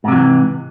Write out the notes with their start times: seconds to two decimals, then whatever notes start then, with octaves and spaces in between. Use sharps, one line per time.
0.04 G#2
0.08 C3
0.12 F#3
0.16 E3